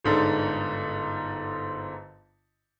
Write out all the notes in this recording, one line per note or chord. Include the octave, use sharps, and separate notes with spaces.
G1 G#2 D3